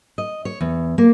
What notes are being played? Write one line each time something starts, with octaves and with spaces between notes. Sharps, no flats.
D#5
C#5
E2
A#3